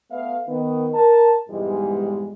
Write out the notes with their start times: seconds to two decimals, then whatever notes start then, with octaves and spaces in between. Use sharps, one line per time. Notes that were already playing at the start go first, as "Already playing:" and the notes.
0.11 A3 B3 B4 E5 F5
0.49 D#3 B3
0.95 A#4 A5
1.50 F2 G#2 B2 E3 G3 G#3